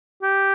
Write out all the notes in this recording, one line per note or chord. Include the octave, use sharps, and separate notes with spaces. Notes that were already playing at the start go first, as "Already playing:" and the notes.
G4